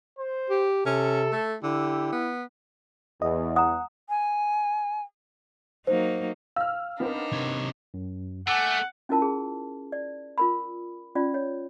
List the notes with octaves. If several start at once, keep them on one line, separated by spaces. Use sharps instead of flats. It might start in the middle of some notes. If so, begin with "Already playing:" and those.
C5
G4
C3 C#4 A4
A3
D3 E4 G4
B3
E2 D#5
F#5 A#5 D#6
G#5
F#3 A#3 D#4 C5
F5 E6 F6
B3 C4 D4 D#4 A#4
C3 C#5
F#2
A3 F#5 G#5 D6 E6
C#4 E4 F4 A#4 A5
G#4
D5
F4 A#4 B5
C#4 F4 D5
C#5